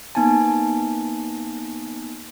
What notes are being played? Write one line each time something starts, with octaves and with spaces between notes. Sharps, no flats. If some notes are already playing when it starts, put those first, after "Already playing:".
A#3 B3 D#4 G#5 A5